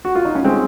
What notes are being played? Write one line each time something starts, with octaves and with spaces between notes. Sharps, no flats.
F#4
F4
D#4
C#4
G#3 C4